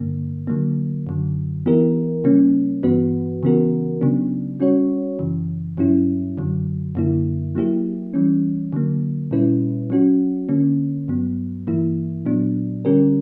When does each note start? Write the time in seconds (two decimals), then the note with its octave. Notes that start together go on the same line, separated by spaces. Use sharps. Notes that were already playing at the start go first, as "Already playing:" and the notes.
Already playing: G2 D3 A#3
0.47 D3 F#3 A#3
1.07 F#2 D3 F#3
1.66 E3 B3 E4 G4 A#4
2.24 C#3 G3 A#3 C#4
2.83 G2 E3 B3 F#4 B4
3.43 C#3 E3 B3 F#4 A#4
4.01 C#3 F#3 B3 D4
4.60 G3 C#4 F#4 C#5
5.19 F#2 C#3 E3
5.77 G2 F#3 C#4 E4
6.38 F#2 D3 F#3
6.95 F#2 D3 A#3 E4
7.55 F#3 A#3 E4 G4
8.14 E3 G3 C#4
8.73 D3 F#3 A#3
9.31 A#2 G3 C#4 E4 B4
9.90 F#3 C#4 F#4
10.49 D3 A#3 C#4
11.08 G2 F#3 B3
11.67 G2 E3 A#3 E4
12.25 A#2 F#3 B3 D4
12.85 D3 G3 C#4 G4 A#4